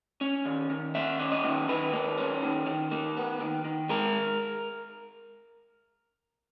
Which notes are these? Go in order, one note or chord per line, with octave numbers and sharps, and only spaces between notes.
C#4
D#3
D#3
A#3 E5
C#4
D#5
D#3
D#3 B4
A#3
C#4
D#3
D#3
A#3
B3
D#3
D#3
G#3 A#4